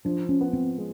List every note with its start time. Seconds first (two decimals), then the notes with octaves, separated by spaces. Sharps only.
0.05 F3 D4
0.29 C#4
0.41 B3
0.53 C4
0.78 G#3